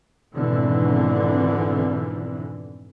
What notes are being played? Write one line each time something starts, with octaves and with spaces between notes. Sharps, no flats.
G#1 F2 B2 D3 E3